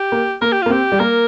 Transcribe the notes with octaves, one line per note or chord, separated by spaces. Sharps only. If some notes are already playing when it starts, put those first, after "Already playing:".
Already playing: G4
A#3
A#3 A#4
G4
A#3 F4
C4 G4
G3
A#3 A#4